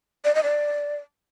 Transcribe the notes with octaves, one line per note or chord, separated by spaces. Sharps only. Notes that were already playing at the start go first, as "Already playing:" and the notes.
D5
D#5
D5